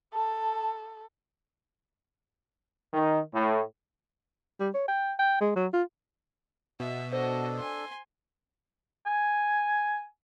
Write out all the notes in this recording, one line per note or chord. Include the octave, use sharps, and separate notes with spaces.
A4 A5
D#3
A2
G3
C#5
G5
G5
G#3
F#3
F4
B2 E5
D4 F#4 A4 C5 D#5
G#5 C6
G#5